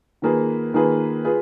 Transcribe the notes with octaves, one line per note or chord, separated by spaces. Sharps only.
D#3 A#3 F4 G#4 B4
D#3 A#3 F4 G#4 B4
F4 G#4 B4